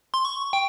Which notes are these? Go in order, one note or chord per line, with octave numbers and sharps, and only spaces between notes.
C6
C#6
G5